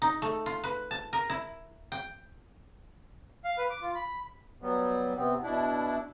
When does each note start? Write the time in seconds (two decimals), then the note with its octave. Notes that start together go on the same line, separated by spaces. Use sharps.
0.02 D#4
0.22 A3
0.46 F4
0.64 B4
0.91 A5
1.13 A#4
1.30 E4
1.92 G5
3.44 F5
3.58 B4
3.70 D6
3.82 F4
3.95 B5
4.62 F#3 G3 B3
5.17 C3 B3 C4
5.43 B2 D4 E4